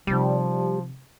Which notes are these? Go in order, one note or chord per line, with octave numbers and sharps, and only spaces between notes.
C3 D#3 F3 G3